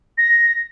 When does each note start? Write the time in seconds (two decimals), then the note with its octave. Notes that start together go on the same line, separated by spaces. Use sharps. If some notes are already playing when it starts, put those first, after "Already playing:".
0.18 A#6